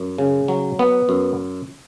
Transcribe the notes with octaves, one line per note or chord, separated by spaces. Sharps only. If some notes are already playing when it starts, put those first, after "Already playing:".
Already playing: F#2
C#3
F#3
B3
F#2